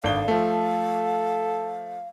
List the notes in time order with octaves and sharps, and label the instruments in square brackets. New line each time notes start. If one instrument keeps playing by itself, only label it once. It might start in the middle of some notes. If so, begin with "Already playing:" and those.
[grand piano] G#1 D4 G7 [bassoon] D3 [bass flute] F5
[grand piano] F3 A3 [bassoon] A4